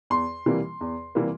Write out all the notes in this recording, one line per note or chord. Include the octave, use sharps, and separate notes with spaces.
E2 C6
C3 E3 G3 A#3
E2
C3 E3 G3 A#3